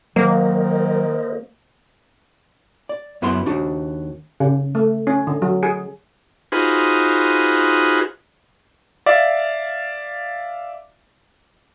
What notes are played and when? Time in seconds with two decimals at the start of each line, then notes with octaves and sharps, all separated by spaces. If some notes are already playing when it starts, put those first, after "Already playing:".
0.16 D#3 F#3 A#3 A#4 C5 D#5
2.89 D5
3.22 F#2 B3 E4 B4 C6
3.46 D#2 D4 F#4
4.40 C#3
4.75 A3
5.07 C#4
5.27 D3
5.42 F#3
5.63 G#4
6.52 D#4 F4 F#4 G#4 B4 C5
9.06 D5 E5 F5